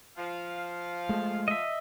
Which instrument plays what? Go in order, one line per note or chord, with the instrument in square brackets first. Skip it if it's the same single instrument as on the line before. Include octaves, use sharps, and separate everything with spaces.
[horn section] F3 F5
[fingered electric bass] G#3 A3
[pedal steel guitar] D#5 E5